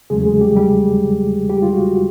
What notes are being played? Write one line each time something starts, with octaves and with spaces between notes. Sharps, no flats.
E2 C#3 F#3 G#3 A3 G#4
G#3 G#4
G3 G4
G3 G4
G3 G4
F4
F#4